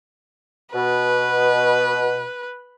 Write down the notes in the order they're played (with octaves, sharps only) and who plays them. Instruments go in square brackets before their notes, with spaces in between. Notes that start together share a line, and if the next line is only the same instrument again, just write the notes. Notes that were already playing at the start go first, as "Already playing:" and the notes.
[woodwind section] B2 [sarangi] B4